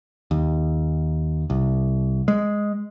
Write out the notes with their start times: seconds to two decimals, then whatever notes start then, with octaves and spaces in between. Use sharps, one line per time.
0.31 D#2
1.50 C2
2.28 G#3